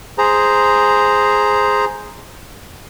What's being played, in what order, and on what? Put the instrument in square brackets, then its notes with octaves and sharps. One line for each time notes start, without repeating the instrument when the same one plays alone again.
[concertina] G#4 C5 A#5